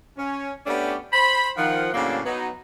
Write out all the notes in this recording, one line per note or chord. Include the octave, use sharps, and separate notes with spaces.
C#4
A3 B3 C#4 D4 G4
C5 B5
D#3 F3 F#5
A2 C#3 F#3 A#3 C4 D4
F#3 B3 D#4